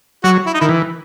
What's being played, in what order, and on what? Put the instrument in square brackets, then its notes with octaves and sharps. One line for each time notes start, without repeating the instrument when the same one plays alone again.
[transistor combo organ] F#3 [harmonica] F#4
[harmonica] E4
D#4
[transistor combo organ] D#3 [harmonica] E4
[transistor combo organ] E3